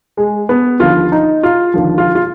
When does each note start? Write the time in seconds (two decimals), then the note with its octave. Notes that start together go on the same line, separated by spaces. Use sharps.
0.17 G#3
0.49 B3
0.80 D#2 D3 F3 F4
1.12 D#4
1.43 F4
1.74 D#2 D3 F3
1.98 F4
2.15 F4